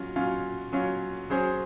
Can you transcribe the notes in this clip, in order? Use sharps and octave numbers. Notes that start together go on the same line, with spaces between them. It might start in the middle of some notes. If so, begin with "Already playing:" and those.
Already playing: F#3 C#4 F4
F#3 C#4 F4
F#3 C#4 F4
F#3 C#4 G#4 C5